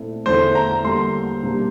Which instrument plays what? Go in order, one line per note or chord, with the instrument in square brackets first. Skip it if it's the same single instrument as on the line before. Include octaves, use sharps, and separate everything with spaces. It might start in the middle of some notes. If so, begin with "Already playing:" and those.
Already playing: [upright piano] A#2 A3 C4 E4
[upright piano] E2 D3 A3 E4 [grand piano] C5
[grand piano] A#5
[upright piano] D3 G3 A#3 [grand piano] C6
[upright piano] C3 G3 A#3 D4